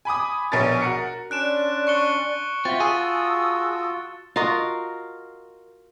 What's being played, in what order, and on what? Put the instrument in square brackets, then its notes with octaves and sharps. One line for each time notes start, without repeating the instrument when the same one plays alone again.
[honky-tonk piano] G#5 B5 D6 D#6
A#1 B2 G#4 A#4 C#5 A6
F#4 A#4 C#7
[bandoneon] C#4 D4 [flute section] D5 C6 [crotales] F#6 D7 E7
[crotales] C#6 C#7 G7
[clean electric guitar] C4 [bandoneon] F4 F#4 [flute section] E5 [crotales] A6
[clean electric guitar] G#4 [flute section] A5 D#6 E6
[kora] F4 F#4 A#4 D#5